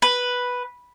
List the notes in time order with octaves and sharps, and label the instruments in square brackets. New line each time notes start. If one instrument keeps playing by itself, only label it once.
[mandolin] B4